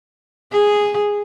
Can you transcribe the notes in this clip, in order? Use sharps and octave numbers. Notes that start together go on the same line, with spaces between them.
G#4